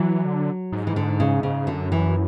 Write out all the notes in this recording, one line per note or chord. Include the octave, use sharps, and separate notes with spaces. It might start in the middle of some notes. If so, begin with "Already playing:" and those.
Already playing: E3 F#3
D3
G#2
E3
D3
C#3
C#3
F#2 D3
E3